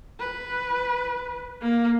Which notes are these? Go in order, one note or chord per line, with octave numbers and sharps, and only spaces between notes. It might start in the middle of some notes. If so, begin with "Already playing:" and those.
B4
A#3